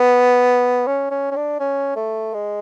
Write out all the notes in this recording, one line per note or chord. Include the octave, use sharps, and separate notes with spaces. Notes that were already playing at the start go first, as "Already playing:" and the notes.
Already playing: B3
C#4
C#4
C#4
D4
C#4
A3
G#3